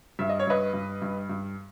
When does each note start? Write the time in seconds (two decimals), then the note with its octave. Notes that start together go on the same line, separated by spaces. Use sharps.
0.19 G2 E5
0.29 D#5
0.40 C#5
0.47 G2 B4 D#5
0.74 G2
1.02 G2
1.29 G2